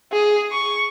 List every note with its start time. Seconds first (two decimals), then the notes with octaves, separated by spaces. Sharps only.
0.12 G#4
0.52 C#6